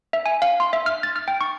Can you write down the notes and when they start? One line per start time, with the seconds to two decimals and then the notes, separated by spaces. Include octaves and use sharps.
0.13 E5
0.26 G#5
0.42 F5
0.60 C6
0.73 E5
0.86 F6
1.03 A6
1.16 F6
1.28 G5
1.41 C#6